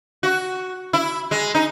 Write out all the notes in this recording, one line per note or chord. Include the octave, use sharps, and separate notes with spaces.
F#4
E4
G#3
D#4